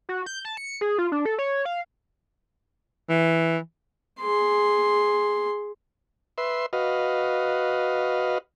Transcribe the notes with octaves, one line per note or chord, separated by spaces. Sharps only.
F#4
G6
A5
C#7
G#4
F4
D4
A4
C#5
F5
E3
G#4 C6
B4 E5 C6
F#4 B4 D#5 F5